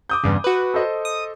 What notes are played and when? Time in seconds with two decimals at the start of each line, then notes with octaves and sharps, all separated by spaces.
0.09 D6 D#6 G6
0.24 E2 G2 C#3
0.44 F#4 B4
0.74 A4 C5 D#5
1.05 D#6